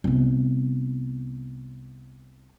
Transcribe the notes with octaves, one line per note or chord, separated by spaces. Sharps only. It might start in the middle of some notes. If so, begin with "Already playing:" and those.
C2 B3